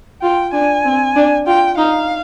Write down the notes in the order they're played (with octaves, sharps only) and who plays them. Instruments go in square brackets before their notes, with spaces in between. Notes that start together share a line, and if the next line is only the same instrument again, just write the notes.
[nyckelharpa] F4 [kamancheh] G5
[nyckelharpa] D4 [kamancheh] G#5
[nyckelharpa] C4
D4
[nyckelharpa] F4 [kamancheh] G5
[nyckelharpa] D#4 [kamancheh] F5